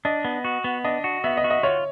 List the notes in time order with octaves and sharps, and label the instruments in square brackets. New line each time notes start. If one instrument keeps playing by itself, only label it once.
[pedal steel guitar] D4 [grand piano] D#5
[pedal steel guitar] B3
F#4
B3
[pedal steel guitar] D4 [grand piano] D#5
[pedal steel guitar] F#4
[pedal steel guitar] B3 [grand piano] E5
[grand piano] D#5
[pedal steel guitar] F#4
[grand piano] D#5
[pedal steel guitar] F4 [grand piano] C#5